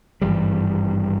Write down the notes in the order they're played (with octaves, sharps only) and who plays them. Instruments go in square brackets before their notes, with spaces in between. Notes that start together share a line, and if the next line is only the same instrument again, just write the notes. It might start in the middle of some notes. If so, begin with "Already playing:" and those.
[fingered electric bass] G#1 G2 E3 G3